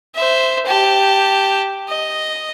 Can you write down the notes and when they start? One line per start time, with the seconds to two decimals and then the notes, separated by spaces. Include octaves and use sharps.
0.15 C5 E5
0.66 G4 A5
1.88 D#5